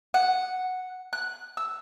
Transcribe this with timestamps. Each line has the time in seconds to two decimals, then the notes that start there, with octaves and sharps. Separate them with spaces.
0.14 F#5
1.13 F#6
1.57 E6